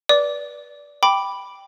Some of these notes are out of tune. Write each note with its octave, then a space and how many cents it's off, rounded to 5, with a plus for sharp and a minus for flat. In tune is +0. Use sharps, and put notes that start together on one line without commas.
B4 -25 D5 -15 D6 -15
G5 +5 B5 +0 D6 +0